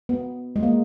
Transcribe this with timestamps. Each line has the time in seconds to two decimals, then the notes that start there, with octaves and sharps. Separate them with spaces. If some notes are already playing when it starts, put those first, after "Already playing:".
0.09 B3
0.56 G#3
0.63 A#3